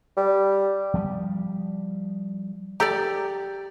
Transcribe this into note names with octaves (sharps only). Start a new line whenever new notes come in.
G3
F3 G3
G4 A4 D5 A#5